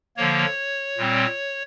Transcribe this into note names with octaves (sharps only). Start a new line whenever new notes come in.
D3 F3 A#3 C#5
A#2 G3 C4